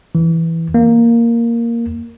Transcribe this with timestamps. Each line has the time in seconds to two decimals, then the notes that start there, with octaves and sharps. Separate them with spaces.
0.15 E3
0.74 A#3